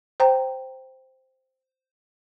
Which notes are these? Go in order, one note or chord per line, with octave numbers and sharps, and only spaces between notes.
C5 G5 A#5